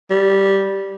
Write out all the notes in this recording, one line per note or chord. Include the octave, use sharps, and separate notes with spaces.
G3